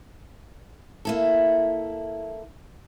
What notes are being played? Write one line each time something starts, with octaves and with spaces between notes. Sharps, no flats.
A#3 E4 A4